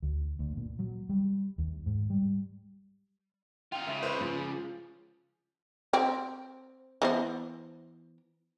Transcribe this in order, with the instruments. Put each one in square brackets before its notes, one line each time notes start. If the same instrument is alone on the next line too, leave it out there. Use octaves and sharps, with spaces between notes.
[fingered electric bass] D2
D2
A#2
F#3
G3
D#2
G#2
G3
[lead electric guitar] D#4 F4 [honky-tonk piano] G5
[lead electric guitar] C#2 C#3 [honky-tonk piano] E5
[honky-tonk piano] B4 C5
F3
[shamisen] C4
E3 B3 C5